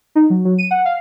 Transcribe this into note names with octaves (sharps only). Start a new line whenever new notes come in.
D#4
F#3
F#3
D#7
F#5
F5